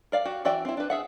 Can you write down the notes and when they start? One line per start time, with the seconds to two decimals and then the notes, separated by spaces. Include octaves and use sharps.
0.12 A#4 D5 F5
0.25 F#4 G4
0.45 E3 F#4 D5 E5 G5
0.65 C4 E4
0.77 D4 B4
0.90 G#4 E5 F#5